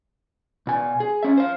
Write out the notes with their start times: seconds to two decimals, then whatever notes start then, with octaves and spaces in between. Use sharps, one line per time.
0.67 B2 G#5
1.00 G#4
1.23 C#4 E5
1.38 C5 F5